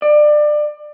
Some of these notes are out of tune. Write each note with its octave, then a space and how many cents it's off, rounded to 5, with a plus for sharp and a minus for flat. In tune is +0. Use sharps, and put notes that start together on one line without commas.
D5 +25